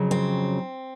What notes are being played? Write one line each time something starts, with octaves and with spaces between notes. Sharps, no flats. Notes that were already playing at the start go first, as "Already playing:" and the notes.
Already playing: F2 C#3 F#3
C4